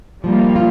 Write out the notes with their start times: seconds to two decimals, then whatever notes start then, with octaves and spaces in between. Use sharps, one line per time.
0.24 F3 G3 A#3
0.56 F4